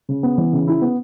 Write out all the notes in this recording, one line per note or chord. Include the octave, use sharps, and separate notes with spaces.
C#3
B3
E3
C#3
E4
B3